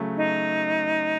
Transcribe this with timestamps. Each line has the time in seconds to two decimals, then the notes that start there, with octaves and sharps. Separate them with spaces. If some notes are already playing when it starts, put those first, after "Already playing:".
Already playing: C#3 F#3 A3
0.17 D#4